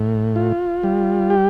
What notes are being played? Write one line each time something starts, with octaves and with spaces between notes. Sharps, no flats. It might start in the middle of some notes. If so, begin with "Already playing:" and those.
Already playing: A2
F4
G3
G4